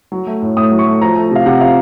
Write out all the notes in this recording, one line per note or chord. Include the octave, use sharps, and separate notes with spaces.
F#3
A3
A2
A2 D#6
F#3
C#6
A3
F3 A#5
A3
C3 F5
C3 F#5
F3 F5